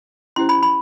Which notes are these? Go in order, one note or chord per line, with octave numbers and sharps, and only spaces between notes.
C#4 E4 G4 C5 C6
B5
B5